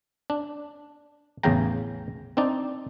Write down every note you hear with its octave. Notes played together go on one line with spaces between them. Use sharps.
D4
A1 E2 C#3 F5 G5 A#5
C4 D4 D#4 D5